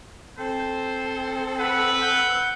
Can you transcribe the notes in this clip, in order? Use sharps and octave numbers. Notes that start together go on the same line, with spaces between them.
C4 A4 C5
B4 F#5 E6
F#5 G6